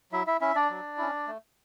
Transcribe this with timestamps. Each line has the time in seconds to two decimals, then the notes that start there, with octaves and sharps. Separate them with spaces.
0.12 F#3 E4 E5
0.27 E4 E5
0.41 C#4 E4 E5
0.55 D4 D5
0.70 F#3
0.98 C#4 E4
1.28 A3